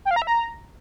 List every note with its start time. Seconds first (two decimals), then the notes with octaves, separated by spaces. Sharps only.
0.05 G5
0.11 F5
0.16 A#5
0.22 E5
0.27 A#5